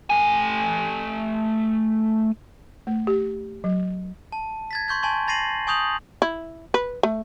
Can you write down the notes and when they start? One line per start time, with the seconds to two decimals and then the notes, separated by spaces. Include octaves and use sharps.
0.10 A3 G#5
2.87 A3
3.07 G4
3.64 F#3
4.32 A5
4.71 G#6 A6 B6
4.88 C6 C#6 G6 G#6
5.03 G#5 A5 C6 C#6
5.28 B5 A6 A#6 C7 D#7 F#7
5.67 G#5 C#6 D#6 G6 F7 F#7
6.22 E4
6.74 B4
7.03 A3